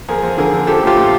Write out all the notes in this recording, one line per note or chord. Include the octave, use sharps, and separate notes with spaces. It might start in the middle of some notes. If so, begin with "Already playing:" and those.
F2 G#4 A#4
F2
D3 G#4 A#4
D3
F3 G4 A4
A2 F4 G4
A2